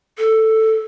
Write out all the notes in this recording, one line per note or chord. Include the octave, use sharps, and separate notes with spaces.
A4